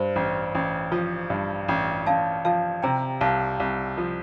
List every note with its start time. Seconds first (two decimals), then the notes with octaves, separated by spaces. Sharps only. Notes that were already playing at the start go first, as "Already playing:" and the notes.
Already playing: G2 C5
0.16 A1
0.55 A1
0.92 F3
1.30 G2
1.68 A1
2.07 A1 F5 A5
2.45 F3 F5 A5
2.83 C3 G5 A#5
3.21 C2 F5 A5
3.60 C2
3.98 F3